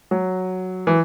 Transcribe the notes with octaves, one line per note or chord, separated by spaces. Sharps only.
F#3
E3